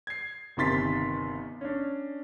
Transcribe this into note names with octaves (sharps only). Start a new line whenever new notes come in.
G#6 C7
G1 C3 D#3 C6 A6 B6
C#4 D4